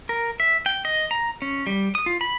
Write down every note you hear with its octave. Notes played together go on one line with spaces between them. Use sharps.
A#4
E5
G5
D#5
A#5
C#4
G3
D#6
F4
B5